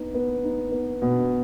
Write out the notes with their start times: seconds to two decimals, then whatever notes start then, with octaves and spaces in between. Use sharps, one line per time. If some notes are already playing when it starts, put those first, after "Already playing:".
Already playing: B3 D#4
0.14 B3
0.44 D#4
0.72 B3
1.02 B2